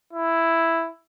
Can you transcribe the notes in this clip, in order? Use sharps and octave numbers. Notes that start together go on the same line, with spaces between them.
E4